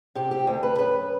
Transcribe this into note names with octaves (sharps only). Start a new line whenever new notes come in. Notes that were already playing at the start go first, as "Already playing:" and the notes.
C3 G4
G4
D2
B4
F#2 B4